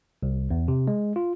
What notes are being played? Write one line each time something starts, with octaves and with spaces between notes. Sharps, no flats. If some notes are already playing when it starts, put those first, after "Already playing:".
C2
E2
C3
G#3
F4